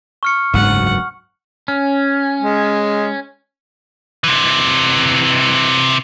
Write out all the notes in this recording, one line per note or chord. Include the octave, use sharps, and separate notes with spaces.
C#6 F6 C#7
F#1 D2 G#2 F#3 F#5
C#4
G#3
C3 E3